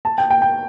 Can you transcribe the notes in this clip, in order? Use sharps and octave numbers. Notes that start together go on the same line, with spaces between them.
A5
G5
G5
G5